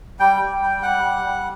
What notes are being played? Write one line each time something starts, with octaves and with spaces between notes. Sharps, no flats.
G3 G5
G3
G3
G3 F#5
G3
G3